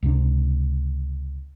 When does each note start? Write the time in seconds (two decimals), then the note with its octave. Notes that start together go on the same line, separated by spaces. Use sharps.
0.03 C#2 C3 D4